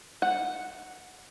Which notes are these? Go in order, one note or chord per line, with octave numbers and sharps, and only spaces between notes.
F#5